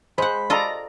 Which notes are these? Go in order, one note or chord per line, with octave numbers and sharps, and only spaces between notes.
G#3 C5 F#5 B5
F4 A4 D5 D#5 A#5